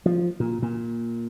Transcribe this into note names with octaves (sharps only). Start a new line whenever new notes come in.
F3
A#2
A#2